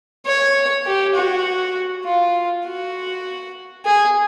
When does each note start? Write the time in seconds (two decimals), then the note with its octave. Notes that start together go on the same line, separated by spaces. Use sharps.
0.26 C#5
0.86 G4
1.15 F#4
2.05 F4
2.65 F#4
3.86 G#4